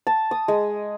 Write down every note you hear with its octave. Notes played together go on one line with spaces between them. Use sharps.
A5
D#6
G#3